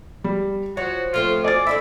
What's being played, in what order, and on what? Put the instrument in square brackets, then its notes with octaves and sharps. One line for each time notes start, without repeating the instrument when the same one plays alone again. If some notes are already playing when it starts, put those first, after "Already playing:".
[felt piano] G3
[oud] F3 [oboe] F#4 [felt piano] C#5
[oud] F3 A3 C4 [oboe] F4
[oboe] D5 [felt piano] D#5 G#5 A6
[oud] A3 D4 E4 [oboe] E5